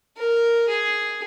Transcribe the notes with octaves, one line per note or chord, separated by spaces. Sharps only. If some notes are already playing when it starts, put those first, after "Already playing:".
A#4
G#4